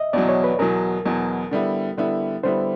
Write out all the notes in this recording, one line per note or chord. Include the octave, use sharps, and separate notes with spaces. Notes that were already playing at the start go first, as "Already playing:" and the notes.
Already playing: D#5 E5
E2 B2 F#3 D5
C#5
B4
E2 B2 F#3 A#4
E2 B2 F#3
D3 G3 B3 E4
D3 G3 B3 E4
D3 G3 B3 E4 C5